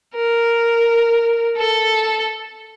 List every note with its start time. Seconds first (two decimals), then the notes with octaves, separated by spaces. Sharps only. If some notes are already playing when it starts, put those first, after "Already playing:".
0.15 A#4
1.57 A4